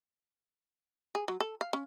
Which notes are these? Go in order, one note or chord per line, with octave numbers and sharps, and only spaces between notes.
G#4
F#3
A4
F5
C#4